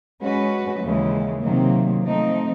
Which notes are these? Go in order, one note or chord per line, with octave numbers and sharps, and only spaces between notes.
G#3 C#4 F#4 B4
D#2 C#3 E3 G#3
C3 D#3 F#3 A#3
F3 A3 C4 D#4